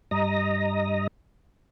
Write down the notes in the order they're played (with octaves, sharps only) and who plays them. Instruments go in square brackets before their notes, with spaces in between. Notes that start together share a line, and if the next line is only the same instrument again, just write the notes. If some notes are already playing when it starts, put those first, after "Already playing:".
[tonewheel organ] G2 D#5 A#5